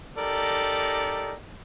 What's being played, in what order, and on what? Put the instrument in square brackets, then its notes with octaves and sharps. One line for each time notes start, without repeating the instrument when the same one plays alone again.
[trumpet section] D#4 G4 A4 A#4 D5